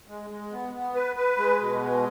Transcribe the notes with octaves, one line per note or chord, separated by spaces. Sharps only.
G#3
G#3
B3
B3
B4
B4
G#3
B2
G#3